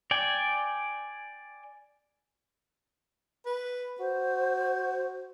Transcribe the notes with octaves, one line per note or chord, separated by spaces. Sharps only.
D5 G5 G#5
B4
F#4 C5